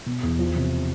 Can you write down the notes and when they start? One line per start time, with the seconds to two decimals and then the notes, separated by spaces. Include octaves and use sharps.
0.06 B2
0.23 E2
0.39 F3
0.56 C3